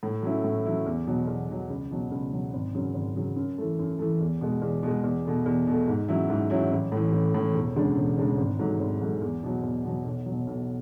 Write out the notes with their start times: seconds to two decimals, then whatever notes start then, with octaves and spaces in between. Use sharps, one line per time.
0.03 A2
0.23 F#3 C#4 E4
0.44 A2
0.65 F#3 C#4 E4
0.86 E2
1.07 B2 F#3
1.27 E2
1.49 B2 F#3
1.70 C#2
1.91 B2 F#3
2.11 C#2
2.33 B2 F#3
2.54 G#1
2.75 F#2 C#3 F#3
2.94 G#1
3.16 F#2 C#3 F#3
3.36 F#2
3.58 E3 A3
3.79 F#2
3.99 E3 A3
4.21 E2
4.41 B2 G#3
4.62 E2
4.83 B2 G#3
5.04 E2
5.25 B2 A3
5.46 E2
5.67 B2 A3
5.88 G#2
6.09 F#3 C#4 E4
6.30 G#2
6.50 F#3 C#4 E4
6.71 A1
6.92 A2 E3
7.13 A1
7.34 A2 E3
7.54 E1
7.76 D2 C#3 G#3 D4
7.97 E1
8.17 D2 C#3 G#3 D4
8.38 G#1
8.59 G#2 F#3 A3
8.80 G#1
9.02 G#2 F#3 A3
9.21 E2
9.43 B2 F#3
9.63 E2
9.85 B2 F#3
10.05 B1
10.26 B2 F#3
10.47 B1